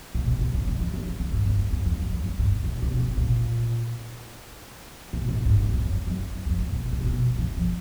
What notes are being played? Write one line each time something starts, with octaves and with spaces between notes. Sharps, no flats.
A#2
B2
C3
C#3
D#3
E3
E3
D#3
D3
G#2
G2
F2
F#2
E2
G#2
F#2
G2
G2
B2
A#2
B2
C3
A#2
B2
A#2
A2
G#2
F#2
F2
F#2
F#2
F2
F2
A#2
B2
C3
B2
A#2
B2
E3
F3